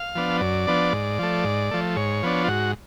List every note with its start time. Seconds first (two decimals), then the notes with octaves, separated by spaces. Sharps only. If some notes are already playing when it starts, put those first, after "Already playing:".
Already playing: F5
0.15 F3 B3 D4
0.41 F#2 D5
0.67 F3 B3 D4
0.93 G#2
1.19 F3 A3
1.44 G#2
1.71 F3 A3
1.96 G#2 C#5
2.23 F3 B3 D4
2.44 F4
2.48 G#2 F#4